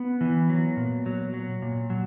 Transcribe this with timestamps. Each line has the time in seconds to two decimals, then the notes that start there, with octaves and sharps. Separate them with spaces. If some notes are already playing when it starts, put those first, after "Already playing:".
Already playing: B3
0.21 E3
0.49 F#3
0.77 A#2
1.06 F#3
1.34 F#3
1.62 A#2
1.90 F#3